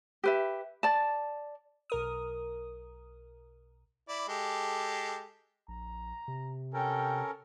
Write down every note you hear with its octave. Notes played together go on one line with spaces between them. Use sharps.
G4 B4 E5
D5 A5
B1 A#4 D#6
E4 D5
G#3 G4 A4
A#1 A#5
C3
C#4 A4 A#4 G5